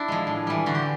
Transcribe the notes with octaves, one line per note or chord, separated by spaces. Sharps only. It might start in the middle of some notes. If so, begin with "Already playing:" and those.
Already playing: D4 E4
F3 G#3
A2
E3 G3
D3 F#4
G4